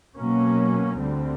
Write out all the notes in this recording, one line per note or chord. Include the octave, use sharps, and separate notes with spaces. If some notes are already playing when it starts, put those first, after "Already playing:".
B2 F#3 A#3 C#4
D2 D3 G3 C4